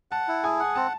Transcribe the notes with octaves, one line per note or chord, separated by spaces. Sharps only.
F#5 A5
E4
G#4 G#5
F#5
C4 A5